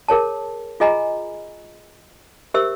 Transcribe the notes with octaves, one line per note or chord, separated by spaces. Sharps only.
G#4 A#4 C#5 A5
F4 G#4 D#5 G#5 A#5 B5
G4 A#4 C5 E5 E6